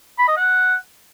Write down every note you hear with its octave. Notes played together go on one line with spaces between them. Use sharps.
B5
D#5
F#5